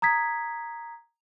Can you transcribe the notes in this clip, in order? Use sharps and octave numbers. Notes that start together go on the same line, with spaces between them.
A#5 D#6 G#6 B6